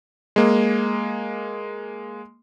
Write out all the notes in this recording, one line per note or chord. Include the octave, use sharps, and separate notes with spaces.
G#3 A#3